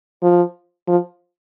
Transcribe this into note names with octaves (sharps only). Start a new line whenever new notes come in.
F3
F3